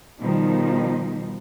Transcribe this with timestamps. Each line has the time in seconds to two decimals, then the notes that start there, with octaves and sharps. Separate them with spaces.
0.21 B2 D#3 F3 G3 D#4